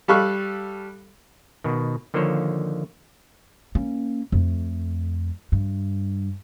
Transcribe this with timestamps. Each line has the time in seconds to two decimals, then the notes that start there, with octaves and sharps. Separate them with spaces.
0.08 G3 A4 F5 B5 C#6 F#6
1.64 B2 D#3
2.14 D3 D#3 F3 A#3 C5 C#5
3.75 A#3 C#4
4.32 F2 A3
5.52 G2